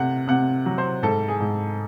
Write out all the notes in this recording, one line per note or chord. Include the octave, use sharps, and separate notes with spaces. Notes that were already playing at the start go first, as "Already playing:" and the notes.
Already playing: C3 A3 F#5
C3 F#5
F#3
C5
G#2 A4
G#4
G#2